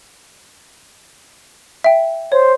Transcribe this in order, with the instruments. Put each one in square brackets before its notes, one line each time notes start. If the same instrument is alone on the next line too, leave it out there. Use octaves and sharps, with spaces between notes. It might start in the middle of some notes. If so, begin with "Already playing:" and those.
[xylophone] E5 G5
[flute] C5 [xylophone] C#5